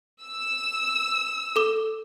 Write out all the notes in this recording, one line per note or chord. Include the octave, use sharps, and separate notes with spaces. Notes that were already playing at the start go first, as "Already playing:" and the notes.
E6
A4 D6